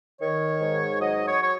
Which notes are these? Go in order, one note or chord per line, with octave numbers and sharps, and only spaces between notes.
D#3 C#5
G#2
F#3 D#5
C#5
C#5